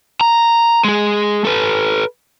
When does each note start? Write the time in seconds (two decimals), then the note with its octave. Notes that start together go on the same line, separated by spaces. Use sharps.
0.21 A#5
0.84 G#3 G#4
1.45 A4 B4